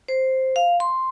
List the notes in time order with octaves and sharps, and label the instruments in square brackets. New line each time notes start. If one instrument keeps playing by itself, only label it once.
[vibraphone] C5
F5
C6